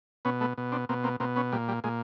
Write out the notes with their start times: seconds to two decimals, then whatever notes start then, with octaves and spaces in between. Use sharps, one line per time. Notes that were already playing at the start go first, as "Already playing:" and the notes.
0.25 B2 B3 C#4
0.41 A3 B3
0.57 B2
0.72 C4 D4
0.89 B2 A#3 C4
1.04 A#3 C4
1.20 B2 A#3 C4
1.36 B3 C#4
1.52 A#2 G3
1.68 G3
1.84 A#2 G#3